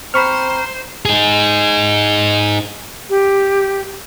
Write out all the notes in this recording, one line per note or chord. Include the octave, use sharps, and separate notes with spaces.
C4 C5 A#5 B5 C#6 F6
D#4 G#4
G4